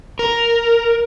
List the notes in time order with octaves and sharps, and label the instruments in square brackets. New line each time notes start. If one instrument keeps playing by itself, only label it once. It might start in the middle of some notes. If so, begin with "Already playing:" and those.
[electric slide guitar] A#4